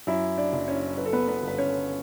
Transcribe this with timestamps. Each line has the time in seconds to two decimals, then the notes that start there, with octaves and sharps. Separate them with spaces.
0.07 F#2 E4 E5
0.38 D4 D5
0.53 F#1
0.68 C#4 C#5
0.98 F#2 B4
1.06 A4
1.13 B3 B4
1.28 B3 B4
1.43 G1
1.48 B4
1.58 C#4 C#5